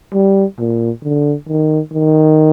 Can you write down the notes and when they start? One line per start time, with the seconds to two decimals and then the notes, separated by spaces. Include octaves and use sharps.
0.13 G3
0.59 A#2
1.04 D3
1.48 D#3
1.93 D#3